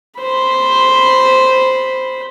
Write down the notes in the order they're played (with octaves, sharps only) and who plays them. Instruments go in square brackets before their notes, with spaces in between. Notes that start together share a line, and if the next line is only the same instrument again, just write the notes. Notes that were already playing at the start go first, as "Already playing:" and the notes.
[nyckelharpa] C5 B5